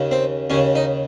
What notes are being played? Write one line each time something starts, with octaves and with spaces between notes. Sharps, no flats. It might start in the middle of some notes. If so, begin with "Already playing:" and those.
Already playing: D#2 C#3
C4
D#2 C#3 C#4
D#4